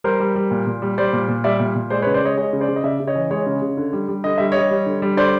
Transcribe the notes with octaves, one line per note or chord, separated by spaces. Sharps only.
G3 A#4 C5
G3
G3
A#2
A#2
G3
G3 C5 D5
A#2
A#2
G3 D5 E5
A#2
A#2
G#3 C5 D5
B4 C#5
C#3
C5 D5
G#3 C#5 D#5
G#3 C#5 D#5
C#3
C5 D5
C#3
D#5
C#3 D5 E5
C#3
C#5 D#5
E3
G#3 C#5 D#5
C#3
C#3
D3
G3
G3
D3 D#5
G3 E5
G3 C#5 D#5
G3
D3
G3
D3 C5 D5